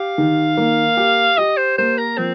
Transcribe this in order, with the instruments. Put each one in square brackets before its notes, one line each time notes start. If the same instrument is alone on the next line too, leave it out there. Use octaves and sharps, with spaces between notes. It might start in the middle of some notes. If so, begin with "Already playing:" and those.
Already playing: [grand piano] G4 [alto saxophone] F5
[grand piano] D#3
A#3
G4
[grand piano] G4 [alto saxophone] D#5
[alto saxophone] C5
[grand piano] A#3 [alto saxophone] C5
[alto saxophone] A#4
[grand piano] F3 [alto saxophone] C4